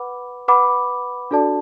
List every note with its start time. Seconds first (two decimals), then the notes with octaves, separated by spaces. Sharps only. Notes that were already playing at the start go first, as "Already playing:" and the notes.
Already playing: B4 F#5 B5 D6
0.48 B4 F#5 B5 D6
1.31 D4 F#4 A4 D5 A5